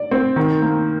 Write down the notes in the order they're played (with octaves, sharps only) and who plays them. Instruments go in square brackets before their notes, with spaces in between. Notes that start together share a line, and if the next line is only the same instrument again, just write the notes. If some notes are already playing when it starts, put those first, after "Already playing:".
Already playing: [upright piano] D5
C4
D#3
A#3